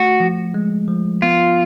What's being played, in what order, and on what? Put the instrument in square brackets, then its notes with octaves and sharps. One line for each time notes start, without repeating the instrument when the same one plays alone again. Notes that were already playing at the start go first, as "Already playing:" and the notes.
Already playing: [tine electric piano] A3 [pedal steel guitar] F#4
[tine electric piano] F3
G#3
F3
[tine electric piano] B3 [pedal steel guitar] F4